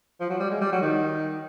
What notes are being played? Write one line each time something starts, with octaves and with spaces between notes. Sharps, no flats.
F3
F#3
G3
G#3
G3
F#3
D#3